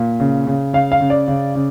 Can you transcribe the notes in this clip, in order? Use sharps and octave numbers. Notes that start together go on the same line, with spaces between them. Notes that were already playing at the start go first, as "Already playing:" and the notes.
Already playing: A#2
C#3
C#3
C#3 F5
F5
C#3
D5
C#3
C#3